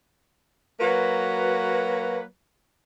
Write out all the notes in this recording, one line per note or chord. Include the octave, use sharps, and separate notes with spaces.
F#3 A#3 F#4 B4